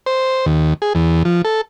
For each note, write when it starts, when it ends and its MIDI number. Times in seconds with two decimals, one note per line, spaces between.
0.06 0.46 72
0.46 0.73 39
0.82 0.93 68
0.95 1.23 40
1.25 1.42 53
1.45 1.61 69